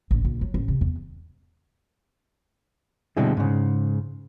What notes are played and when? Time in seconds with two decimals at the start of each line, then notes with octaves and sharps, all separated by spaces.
0.11 A1
0.24 A#1
0.41 F#3
0.54 A1
0.68 C3
0.81 E2
3.17 B2 D3 G3 G#3 C4 E4
3.37 G#2 C#3